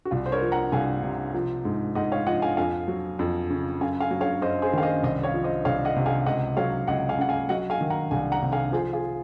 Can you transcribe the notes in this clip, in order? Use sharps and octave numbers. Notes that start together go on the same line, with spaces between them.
F#4
C2 F4
C5
A#4 C#5
F3
F#5 A#5
C2 F5 G#5
C3
F3
G#2
G#2 D#5 F#5
C#5 F5
F3 D#5 F#5
F5 G#5
F2 F5 G#5
F#3
F2
C#3
F#2 F5 G#5
F5 G#5
F#3
C#5 F5
F#2 C5 D#5
G#4 C5
D#3 F5
C5 D#5
C2 C5 D#5
C#5 F5
F3
C5 D#5
C2 C#5 F5
D#5 F#5
C3
F5 G#5
C#2 D#5 F#5
F#3 C#5 F5
C#2 D#5 F#5
F5 G#5
C#3 F#5
F5 G#5
F#3 D#5 F#5
F5 G#5
D#3
F#5 A#5
C2 F5 G#5
F#5 A#5
C3
F5 G#5
F3 G#4 C5
F4 G#4